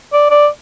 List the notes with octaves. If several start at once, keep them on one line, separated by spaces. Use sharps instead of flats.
D5
D5